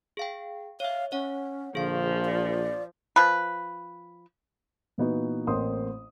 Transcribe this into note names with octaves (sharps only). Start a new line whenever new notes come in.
G#4 F5 G5
C#5 E5 F5
C#4 C#5 F#5
A#1 D3 F3 G#4 F5
D5
F3 B4
A#2 E3 B3 D#4 F#4
A1 A#3 C4 C5 C6 D#6